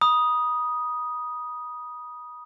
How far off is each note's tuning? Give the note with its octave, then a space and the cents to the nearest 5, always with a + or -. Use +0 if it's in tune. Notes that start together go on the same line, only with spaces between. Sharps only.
B5 -35 D#6 +0